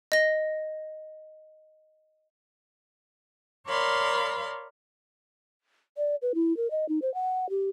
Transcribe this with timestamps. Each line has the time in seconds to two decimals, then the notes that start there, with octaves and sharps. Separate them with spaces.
0.12 D#5 A#6
3.67 A#4 C#5 D5 F5 B5 C6
5.98 D5
6.22 B4
6.35 E4
6.57 A#4
6.71 D#5
6.89 D#4
7.02 C5
7.14 F#5
7.50 G4